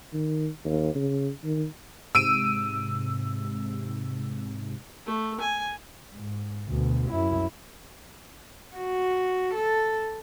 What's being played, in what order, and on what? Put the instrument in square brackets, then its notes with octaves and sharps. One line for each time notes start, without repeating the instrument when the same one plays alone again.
[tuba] D#3
D#2
C#3
D#3
[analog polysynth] G#2 C3 [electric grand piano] E6 D7 D#7
[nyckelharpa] A3
G#5
[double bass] G#2
D2 B2
F#2 E4
[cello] F#4
A4